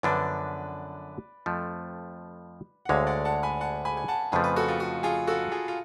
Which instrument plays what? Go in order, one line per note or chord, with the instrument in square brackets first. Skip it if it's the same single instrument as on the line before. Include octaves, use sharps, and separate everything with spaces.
[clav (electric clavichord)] F#2 D3 F3 B3 D4 [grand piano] B4 D5
[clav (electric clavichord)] F2 F3 A3
[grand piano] F#5
[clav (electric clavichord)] D2 D3 G#3 [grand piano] C#5 F5
[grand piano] D5 F#5
F#5 A5
G#5 B5
F#5 A5
G#5 B5
G#5
F#5 A5
[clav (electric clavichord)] F2 C#3 F3 A3 [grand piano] G#4 B4
[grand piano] B4
F#4 A4
F4
F#4
F4 G#4
F#4 A4
F4 G#4
F4